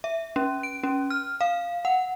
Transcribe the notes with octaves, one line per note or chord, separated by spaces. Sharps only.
E5
C#4
D7
C#4
F6
F5
F#5